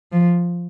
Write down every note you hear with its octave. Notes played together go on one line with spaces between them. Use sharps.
F3